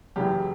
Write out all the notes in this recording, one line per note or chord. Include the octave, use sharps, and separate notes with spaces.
F#1 F#2 C#3 E3 G4